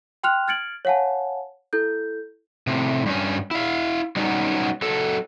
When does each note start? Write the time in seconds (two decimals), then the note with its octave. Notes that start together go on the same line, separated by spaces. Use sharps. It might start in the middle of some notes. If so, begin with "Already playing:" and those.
0.23 G5 C6 F6 F#6 F7
0.48 F6 G#6 A6 C#7 D7 F#7
0.85 C#5 F5 F#5 G#5 A5
1.73 E4 A4 G6
2.67 A2 C3
3.06 G2 C#4
3.51 E4 F5
4.16 F#3 G3 B3 C#4 D#4
4.82 F#3 A4